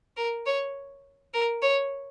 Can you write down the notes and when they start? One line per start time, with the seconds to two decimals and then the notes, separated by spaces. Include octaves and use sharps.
0.17 A#4
0.46 C#5
1.34 A#4
1.63 C#5